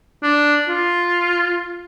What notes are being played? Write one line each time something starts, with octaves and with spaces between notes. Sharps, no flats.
D4
F4